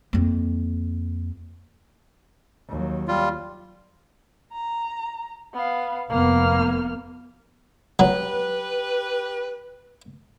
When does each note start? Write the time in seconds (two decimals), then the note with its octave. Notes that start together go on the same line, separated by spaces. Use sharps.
0.13 F2 A#3
2.68 D#2 F#3
3.08 G3 F4
4.52 A#5
5.54 B3 F5
6.10 F1 A#3 B3 F6
7.99 F#3 G4 B4